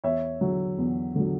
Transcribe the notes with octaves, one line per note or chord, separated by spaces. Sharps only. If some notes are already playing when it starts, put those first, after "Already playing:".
E2 C#5 E5
D3 F#3
E2
D3 F#3